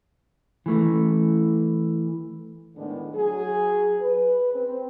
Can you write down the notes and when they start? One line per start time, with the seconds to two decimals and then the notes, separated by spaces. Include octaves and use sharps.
0.66 E3 A3
2.76 A2 D3 D#3 G#3 B3 D4
3.14 F#3 G#4
4.00 B4
4.54 C4